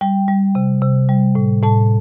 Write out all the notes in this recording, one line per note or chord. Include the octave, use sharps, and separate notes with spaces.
G3 G5
G3
C3
C3
G3
A2
A2 A5